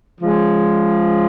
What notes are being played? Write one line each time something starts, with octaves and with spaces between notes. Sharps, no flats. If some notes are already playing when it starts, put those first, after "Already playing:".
C#3 F3 G#3